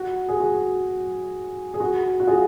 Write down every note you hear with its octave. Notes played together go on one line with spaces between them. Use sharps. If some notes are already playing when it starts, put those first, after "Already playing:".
Already playing: F#4
G#4
F#4
G#4
F#4
F#4
F4 G#4